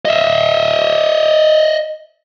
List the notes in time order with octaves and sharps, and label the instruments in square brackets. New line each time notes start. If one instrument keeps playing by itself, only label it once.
[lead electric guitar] D#5 E5